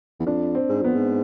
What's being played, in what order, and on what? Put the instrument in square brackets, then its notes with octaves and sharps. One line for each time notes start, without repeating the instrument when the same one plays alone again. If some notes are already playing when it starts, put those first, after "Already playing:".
[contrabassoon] E2
[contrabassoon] F2 [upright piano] D4
[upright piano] C4
[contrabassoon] G#2
[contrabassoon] F2 [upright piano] B3
[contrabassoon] G#2